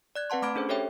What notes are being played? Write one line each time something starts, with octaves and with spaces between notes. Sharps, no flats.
D5 F#6 G#6
C4 B4 F#5 A5 C6
A3 B5 D6 F6 G#6 D7
C#4 D4 G#4 A4 C5
G4 A4 C#5 E5 G5